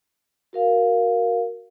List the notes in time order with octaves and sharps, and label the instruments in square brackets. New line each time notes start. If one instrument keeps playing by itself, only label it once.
[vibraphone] F#4 A#4 F5